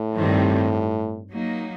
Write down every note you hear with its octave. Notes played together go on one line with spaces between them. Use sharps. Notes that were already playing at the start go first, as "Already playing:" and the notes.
Already playing: A2
G2 D#3 G3 C4
F#3 A#3 D#4